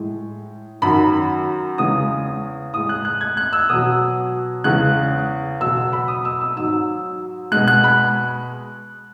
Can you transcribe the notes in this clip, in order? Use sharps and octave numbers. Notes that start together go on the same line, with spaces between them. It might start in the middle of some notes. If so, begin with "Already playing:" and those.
Already playing: A2 G#3
F#2 D#3 F#3 B5
E2 C#3 G#3 D#6
A2 G#3 D#6
F#6
F#6
G#6
F#6
E6
B2 F#3 D#6
E2 C#3 G#3 F#6
B2 F#3 E6
E6
B5
D#6
E6
E6
G#2 F#3 E6
B2 G#3 F#6
F#6
B5